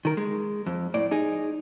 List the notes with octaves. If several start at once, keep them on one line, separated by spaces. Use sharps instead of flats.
D#3 A#4
G#3
F2
A2 D5
D#4 G#4